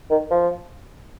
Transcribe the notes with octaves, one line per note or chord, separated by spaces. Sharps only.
D#3
F3